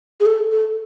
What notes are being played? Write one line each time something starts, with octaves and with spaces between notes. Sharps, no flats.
G#4
A4
A4